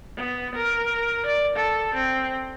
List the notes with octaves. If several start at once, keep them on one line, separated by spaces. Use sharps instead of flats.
B3
A#4
D5
A4
C4